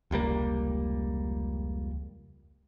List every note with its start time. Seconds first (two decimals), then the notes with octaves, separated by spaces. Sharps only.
0.11 F1 C#2 G3 A#3